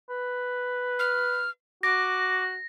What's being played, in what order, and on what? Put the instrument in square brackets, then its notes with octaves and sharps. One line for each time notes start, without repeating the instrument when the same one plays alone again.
[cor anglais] B4
[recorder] F6
[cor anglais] F#4 [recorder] D6 [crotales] A#6